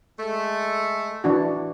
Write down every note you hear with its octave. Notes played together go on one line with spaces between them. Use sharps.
G#3 A3
E3 D4 F#4